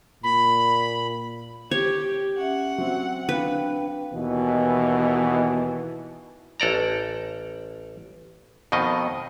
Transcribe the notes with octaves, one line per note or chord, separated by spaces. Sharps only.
A#2 B5
G4 C#5
C#4 E5 F#5
F#3 C4
D4 B4 F5 G5
D#2 B2 E3
A1 A4 D5 A#5
F2 B2 D#3 D#5